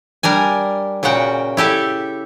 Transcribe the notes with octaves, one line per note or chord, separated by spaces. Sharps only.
G3 D4 A#4 G#5
A#2 C#3 F#4 F#5 G5
E4 G4 A4 E5